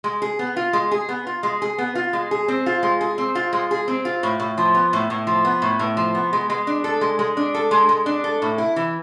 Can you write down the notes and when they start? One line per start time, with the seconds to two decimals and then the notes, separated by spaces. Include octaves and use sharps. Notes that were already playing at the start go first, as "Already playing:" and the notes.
0.04 G#3
0.22 G#4
0.39 B3
0.57 F4
0.73 G#3
0.91 G#4
1.09 B3
1.27 F4
1.43 G#3
1.62 G#4
1.78 B3
1.95 F4
2.13 G#3
2.31 G#4
2.48 C4
2.66 F4
2.83 G#3
3.01 G#4
3.18 C4
3.35 F4
3.53 G#3
3.71 G#4
3.88 C4
4.05 F4
4.23 A2
4.40 A2
4.58 F3
4.74 B3
4.93 A2
5.10 A2
5.27 F3
5.45 B3
5.62 A2
5.79 A2
5.97 F3
6.15 B3
6.33 G#3
6.50 G#3
6.67 D4
6.84 A4
7.01 G#3
7.19 G#3
7.37 D4
7.54 A4
7.71 G#3
7.89 G#3
8.06 D4
8.24 A4
8.42 A2
8.58 E4
8.76 E3